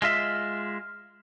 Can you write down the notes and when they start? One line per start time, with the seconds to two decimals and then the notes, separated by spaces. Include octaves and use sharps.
0.02 G#3 F4 E5